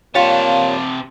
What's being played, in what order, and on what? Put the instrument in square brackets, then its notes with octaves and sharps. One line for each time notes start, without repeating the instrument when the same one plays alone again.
[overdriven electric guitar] C3 A5 [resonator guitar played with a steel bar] G3 F4 [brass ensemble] A#3 F5 [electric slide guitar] C#5